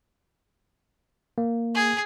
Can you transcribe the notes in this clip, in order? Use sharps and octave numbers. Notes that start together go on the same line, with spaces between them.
A#3
G#4